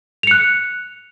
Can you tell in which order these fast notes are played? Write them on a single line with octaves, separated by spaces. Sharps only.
F7 C#7 F#6